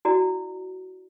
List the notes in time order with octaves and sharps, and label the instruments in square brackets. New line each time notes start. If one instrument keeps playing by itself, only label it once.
[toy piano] E4 F#4 D5 A#5